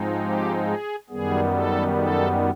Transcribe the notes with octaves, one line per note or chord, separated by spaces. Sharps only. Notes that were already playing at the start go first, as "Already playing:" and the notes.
Already playing: G#2 F3 G#3 C4 D#4
G4
G#4
F#2 D#3 G3 B3 G#4
A4
A4